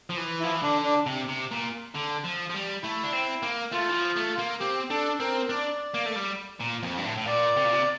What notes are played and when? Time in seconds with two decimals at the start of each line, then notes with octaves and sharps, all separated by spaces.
0.10 F3
0.17 E3
0.40 F3 E4
0.53 E3
0.62 D3 D4
0.84 D4
1.06 C3
1.28 C3
1.51 A#2
1.95 D3
2.24 F3
2.49 F3
2.54 G3
2.83 A3 E4
3.04 D4
3.13 C4
3.43 A#3
3.72 A3 F4
3.89 E3
3.95 F3
4.16 A3
4.38 A#3
4.60 C4 G4
4.90 D4 A4
5.20 C4 A#4
5.49 D4 D5
5.94 A#3
6.05 A3
6.16 G3
6.60 A#2
6.83 F2
6.98 G2
7.04 A2
7.18 A2
7.27 A#2 D5
7.57 C3
7.65 A#2
7.73 C3